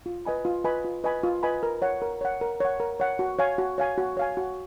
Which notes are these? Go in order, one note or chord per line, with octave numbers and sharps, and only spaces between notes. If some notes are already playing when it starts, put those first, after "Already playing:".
F4
B4 D#5 G#5 B5
F4
B4 D#5 G#5 B5
F4
B4 D#5 G#5 B5
F4
B4 D#5 G#5 B5
A#4
C#5 F#5
A#4
C#5 F#5
A#4
C#5 F#5
A#4
C#5 F#5
F#4
C#5 F5 G#5
F#4
C#5 F5 G#5
F#4
C#5 F5 G#5
F#4